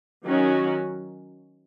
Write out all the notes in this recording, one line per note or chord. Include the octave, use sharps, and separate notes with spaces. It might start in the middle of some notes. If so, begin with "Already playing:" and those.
D#3 F#3 C#4 F#4